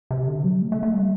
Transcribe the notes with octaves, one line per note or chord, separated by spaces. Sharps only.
C3
D3
F#3
A3
A3
A3
G3